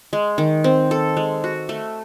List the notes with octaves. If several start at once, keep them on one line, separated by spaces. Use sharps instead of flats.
G#3
D#3
C4
A4
G#3
F#4
A3